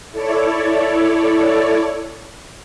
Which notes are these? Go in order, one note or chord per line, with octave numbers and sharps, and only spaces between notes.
E4 A4 C#5 D5